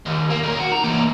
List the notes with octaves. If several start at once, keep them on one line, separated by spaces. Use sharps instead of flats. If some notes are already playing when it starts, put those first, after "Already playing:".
D#2
A#3
B1 A#4
F#4
D#4 A#5
E3 A#3